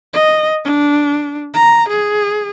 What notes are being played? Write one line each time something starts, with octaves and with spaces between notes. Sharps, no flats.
D#5
D4
A#5
G#4